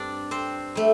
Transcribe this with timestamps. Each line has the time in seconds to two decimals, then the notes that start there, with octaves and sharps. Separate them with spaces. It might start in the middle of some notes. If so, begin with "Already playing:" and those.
Already playing: G2 G3 C4 D4 D5
0.31 C4 C5
0.75 G3 A3